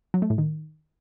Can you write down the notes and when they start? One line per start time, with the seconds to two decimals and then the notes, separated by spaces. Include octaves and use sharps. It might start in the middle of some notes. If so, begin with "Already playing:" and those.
0.14 F#3
0.22 A3
0.30 A2
0.38 D#3